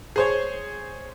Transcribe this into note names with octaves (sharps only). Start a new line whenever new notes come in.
G#4 C5 C#5